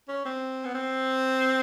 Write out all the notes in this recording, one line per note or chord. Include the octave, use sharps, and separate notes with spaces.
C#4
C4
B3
C4